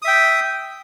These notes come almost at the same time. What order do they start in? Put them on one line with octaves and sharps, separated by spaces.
D#6 E5 G5